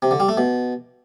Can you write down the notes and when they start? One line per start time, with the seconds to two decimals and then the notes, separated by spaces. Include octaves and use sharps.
0.02 C3
0.11 D3
0.20 G3
0.29 A3
0.37 B2